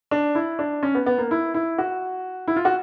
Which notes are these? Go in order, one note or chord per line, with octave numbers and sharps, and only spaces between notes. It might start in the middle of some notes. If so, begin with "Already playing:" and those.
D4
E4
D4
C#4
B3
B3
A#3
E4
E4
F#4
E4
F4
F#4